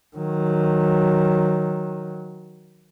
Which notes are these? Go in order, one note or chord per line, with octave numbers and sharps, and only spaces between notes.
D#3 F#3